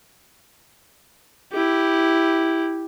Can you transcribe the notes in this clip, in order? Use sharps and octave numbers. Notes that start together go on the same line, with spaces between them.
E4 G4